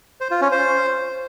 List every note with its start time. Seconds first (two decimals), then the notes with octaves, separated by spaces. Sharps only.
0.21 C5
0.31 F4
0.41 C#4
0.52 C5